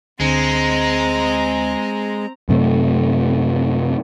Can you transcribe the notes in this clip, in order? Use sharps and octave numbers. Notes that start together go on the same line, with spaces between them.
D2 D3 G#3 C4 A#5 C#7
F#2 C3 A3